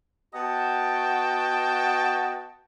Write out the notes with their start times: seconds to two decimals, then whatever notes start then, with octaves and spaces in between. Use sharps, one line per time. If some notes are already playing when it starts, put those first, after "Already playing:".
0.34 B3 F#4 D#5 F#5 G5 A5